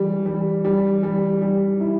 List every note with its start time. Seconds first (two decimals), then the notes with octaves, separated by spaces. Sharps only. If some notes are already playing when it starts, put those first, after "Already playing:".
Already playing: E3 G3
0.26 G3
0.65 G3
1.03 G3
1.42 G3
1.81 E4